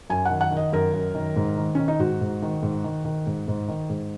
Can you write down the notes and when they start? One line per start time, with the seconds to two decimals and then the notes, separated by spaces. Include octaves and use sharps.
0.10 F#2 G#5
0.25 D#3 F#5
0.41 F#5
0.51 D#3
0.57 D#5
0.72 F#2 A#4
0.93 F#2
1.15 D#3
1.36 G#2
1.57 D#3
1.75 D#3 C#4
1.88 D#4
1.99 G#2 F#4
2.21 G#2
2.42 D#3
2.62 G#2
2.84 D#3
3.05 D#3
3.26 G#2
3.48 G#2
3.68 D#3
3.89 G#2